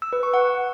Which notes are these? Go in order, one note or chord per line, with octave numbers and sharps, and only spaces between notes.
E6
B4
C#6
F#5